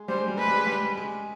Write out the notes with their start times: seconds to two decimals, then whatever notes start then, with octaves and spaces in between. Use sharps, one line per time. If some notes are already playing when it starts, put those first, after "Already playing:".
Already playing: G#3
0.08 G3 C5
0.18 G#3
0.28 G3
0.38 G#3 B4
0.48 G3
0.57 G#3
0.67 G3
0.97 G#3